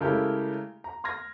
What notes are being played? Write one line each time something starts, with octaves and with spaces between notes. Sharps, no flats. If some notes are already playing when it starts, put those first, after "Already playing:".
C#3 G#3 A3 E4 G4 A#4
A#5
C6 F6 G#6 A#6